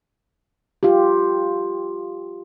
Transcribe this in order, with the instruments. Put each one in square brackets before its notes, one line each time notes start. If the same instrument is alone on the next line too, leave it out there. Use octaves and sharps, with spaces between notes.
[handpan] F4 G4